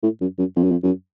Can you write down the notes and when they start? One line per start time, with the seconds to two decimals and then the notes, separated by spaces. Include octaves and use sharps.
0.03 A2
0.21 F#2
0.39 F#2
0.56 F2
0.64 F#2
0.71 F2
0.83 F#2